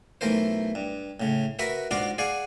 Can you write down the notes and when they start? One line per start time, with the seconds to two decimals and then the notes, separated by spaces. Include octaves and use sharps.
0.21 B1 E3 A3 A#4 C5
0.75 G2
1.20 A2 C#3
1.59 F#4 A#4 B4 E5 F#5
1.91 G#2 D4 F4 F#4 F5 D6
2.18 G#4 D5 F5 F#5 G#5